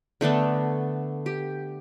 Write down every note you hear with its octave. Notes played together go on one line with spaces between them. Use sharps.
D3 A3 B3 D4
G4